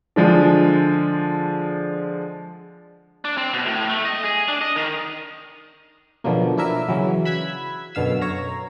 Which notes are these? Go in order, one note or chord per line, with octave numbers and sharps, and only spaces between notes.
D3 F3 G#3 D4
D4
C4
B2
A2
A3
D#5
G#4
D4
D#5
D#3
B2 D3 F3 F#3 A#3
D4 E4 A#4 E5
C#3 E3 F#3
B5 E6 F#6 G#6 B6
F#2 B2 D3 F5 E6
C#5 A#5